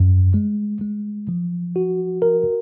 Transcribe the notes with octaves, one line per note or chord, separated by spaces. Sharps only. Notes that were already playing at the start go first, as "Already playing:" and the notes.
Already playing: F#2
G#3
G#3
F3
F#4
A#4